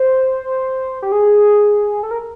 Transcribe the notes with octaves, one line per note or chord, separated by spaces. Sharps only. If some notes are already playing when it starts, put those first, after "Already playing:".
Already playing: C5
G4
G#4
A4
A#4